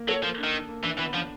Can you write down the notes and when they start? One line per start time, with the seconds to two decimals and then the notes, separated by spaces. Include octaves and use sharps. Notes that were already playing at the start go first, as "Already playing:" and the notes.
Already playing: A#3
0.08 F#3 A4
0.23 F3 A#3
0.38 D4
0.44 D#3
0.54 D4
0.69 A#3
0.84 E3 D4
0.99 E3 B3
1.15 F3 D4